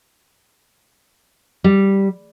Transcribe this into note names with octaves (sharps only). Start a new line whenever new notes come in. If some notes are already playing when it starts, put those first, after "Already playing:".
G3